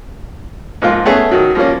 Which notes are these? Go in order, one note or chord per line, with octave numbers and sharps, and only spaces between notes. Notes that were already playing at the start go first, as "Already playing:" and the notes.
G#2 F3 A#3 F4
A3 B3 C#4 G#4 B4
D#3 F#3
F3 G3 A#3 C#4